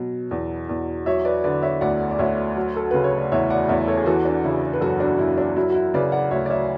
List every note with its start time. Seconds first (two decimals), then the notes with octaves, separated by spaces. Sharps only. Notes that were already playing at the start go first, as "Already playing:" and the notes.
Already playing: B2 F#3
0.31 E2
0.69 E2
1.06 F#3 C#5 E5
1.25 B4 D5
1.44 D3 B4 D5
1.62 C#5 E5
1.81 D2 D5 F#5
2.11 D5
2.19 D2 C#5 E5
2.56 F#3
2.76 A4
2.91 C#3 B4
3.04 C#5
3.18 D5
3.32 E2 C#5 E5
3.50 D5 F#5
3.69 E2 C#5 E5
3.87 A4 C#5
3.97 G#4
4.06 E3 F#4 A4
4.25 D4
4.44 C#3 E4
4.73 B4
4.81 F#2 F#4 A4
5.00 D4 F#4
5.19 F#2 E4
5.38 D4 F#4
5.56 F#3 E4
5.70 F#4
5.75 E4
5.94 C#3 B4 D5
6.12 D5 F#5
6.31 D2 C#5 E5
6.46 D5
6.50 C#5 E5